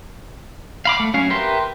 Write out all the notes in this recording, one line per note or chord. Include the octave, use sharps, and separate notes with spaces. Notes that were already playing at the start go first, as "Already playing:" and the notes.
F5 B5 D6
A3
F#3 C#4 F5
G4 A#4 B4 E5 C6